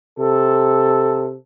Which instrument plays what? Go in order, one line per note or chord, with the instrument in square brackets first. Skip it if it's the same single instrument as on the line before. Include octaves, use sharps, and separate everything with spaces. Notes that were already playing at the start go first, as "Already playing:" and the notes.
[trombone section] C3 A4